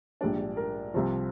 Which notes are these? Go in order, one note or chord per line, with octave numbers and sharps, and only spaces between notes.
A#1 G#2 G3 D4 D5
A#4
C2 C3 F3